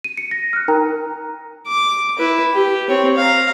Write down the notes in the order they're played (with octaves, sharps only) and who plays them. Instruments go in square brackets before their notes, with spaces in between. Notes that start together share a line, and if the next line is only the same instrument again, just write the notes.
[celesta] D#7
C#7
A#6
F6 F#6
D#4 A#4 G5 A#5
[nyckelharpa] D6
E4 B4
G4
C4 C#5
F5 A#5